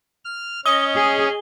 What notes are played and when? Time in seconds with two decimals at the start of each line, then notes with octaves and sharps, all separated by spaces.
0.25 F6
0.66 C#4 D#5 D#6 G7
0.95 G#4